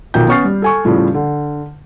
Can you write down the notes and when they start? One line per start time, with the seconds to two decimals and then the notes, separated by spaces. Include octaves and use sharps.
0.14 B1 D#3 F3 G5 G6
0.28 B3 C#4 C#6 F6 A6 C7
0.44 G3
0.62 A4 G#5 C#6
0.85 A2 C#3 F3 G3
1.14 D3